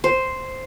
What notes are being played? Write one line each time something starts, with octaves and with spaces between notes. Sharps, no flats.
C5